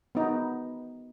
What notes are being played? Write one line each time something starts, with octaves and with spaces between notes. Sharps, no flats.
B3 D#4